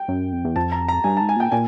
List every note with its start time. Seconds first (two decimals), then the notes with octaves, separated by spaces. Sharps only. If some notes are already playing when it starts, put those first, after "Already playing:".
Already playing: G5
0.08 F#2
0.32 F2
0.45 E2
0.56 F2 A5
0.72 A#5
0.88 A#5
1.04 G2 G#5
1.17 G#2 A5
1.29 G#5
1.36 A#2 G5
1.52 A#2 G#5